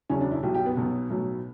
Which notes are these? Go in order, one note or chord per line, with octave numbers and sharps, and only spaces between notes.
E1 E2 C#3 F#3 C#4
D4
E4
B1 B2 F#3 G4
G4
B3
B1 B2 F#3
B1 A2 F#3